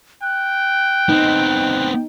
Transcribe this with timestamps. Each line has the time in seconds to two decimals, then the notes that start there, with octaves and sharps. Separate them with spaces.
0.22 G5 F#6
1.09 B3 C4 D#4